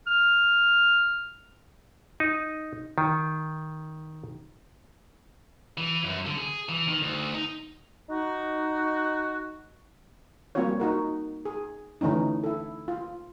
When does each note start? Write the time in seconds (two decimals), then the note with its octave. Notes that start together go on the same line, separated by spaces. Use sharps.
0.07 F6
2.20 D#4
2.98 D#3
5.78 E3
6.04 F#2
6.26 D3
6.38 G#4
6.69 E3
6.88 D#3
7.02 D2
7.34 D#4
8.10 D#4 F#4
10.55 G3 A#3 C4 F4 F#4 C#5
10.80 D#4 F#4 A#4
11.45 G#4
12.01 D3 E3 A3 C#4 D#4
12.43 E4 A4
12.88 F4